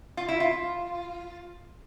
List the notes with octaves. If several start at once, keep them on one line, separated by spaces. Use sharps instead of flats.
F4
E4
F4